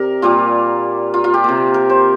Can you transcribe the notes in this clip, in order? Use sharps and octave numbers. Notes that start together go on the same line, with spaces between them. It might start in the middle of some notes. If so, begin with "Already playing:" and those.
Already playing: C3 A#4 D5
A#2 G3 A#3 F4
F4
F4
G4
C3 A#3
A#4
C5